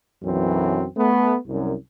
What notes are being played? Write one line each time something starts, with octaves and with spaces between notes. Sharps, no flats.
B1 F#2 E3 C4
A3 B3
C2 F#2